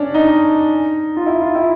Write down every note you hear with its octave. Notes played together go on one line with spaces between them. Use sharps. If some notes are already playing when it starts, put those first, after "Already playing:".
Already playing: C#4 D4
D#4
F4
E4
F4
E4